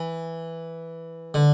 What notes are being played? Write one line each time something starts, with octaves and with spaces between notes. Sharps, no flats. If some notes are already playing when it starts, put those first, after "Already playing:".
Already playing: E3
D3